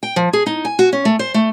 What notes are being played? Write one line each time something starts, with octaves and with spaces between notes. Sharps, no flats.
G5
F3
G#4
D#4
G#5
F#4
C#4
A3
C5
A3